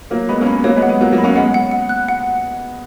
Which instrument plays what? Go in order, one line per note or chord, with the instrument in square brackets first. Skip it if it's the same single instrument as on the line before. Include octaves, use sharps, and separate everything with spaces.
[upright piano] F#3 A#3 [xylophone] C#5
[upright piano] G#3 B3 [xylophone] B5
[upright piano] A#3 C#4
[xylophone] B5
[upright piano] F#3 A#3 [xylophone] C#5
[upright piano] G#3 B3
[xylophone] F#5
[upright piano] G#3 B3
[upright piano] F#3 A#3 [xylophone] F#5
[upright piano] F#3 A#3
[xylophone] B5
[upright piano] A#3 C#4
[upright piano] G#3 B3 [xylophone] F#5
[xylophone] F#5
F#5
F#6
F#5